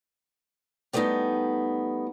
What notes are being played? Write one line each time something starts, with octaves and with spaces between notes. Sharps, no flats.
G3 A3 B3 C4 D#4 G4